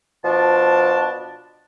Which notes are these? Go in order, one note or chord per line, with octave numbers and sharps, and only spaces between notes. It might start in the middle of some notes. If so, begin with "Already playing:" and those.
B2 F3 D4 A5